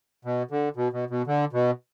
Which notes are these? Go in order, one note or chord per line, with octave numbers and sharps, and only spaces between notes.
B2
D3
B2
B2
B2
D3
B2